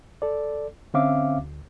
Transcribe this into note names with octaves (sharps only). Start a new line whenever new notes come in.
A4 D5
D3 C4 C#4 E5 F5 D6
D2